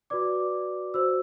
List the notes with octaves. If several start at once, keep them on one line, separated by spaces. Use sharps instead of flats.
F#4 B4 D5 D6
F#4 C5 E6